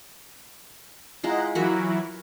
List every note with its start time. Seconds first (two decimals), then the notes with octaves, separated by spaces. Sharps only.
1.24 G#3 E4 F4 D#5 F#5 A#5
1.55 E3 F#3 E4 F#4 A#4 B5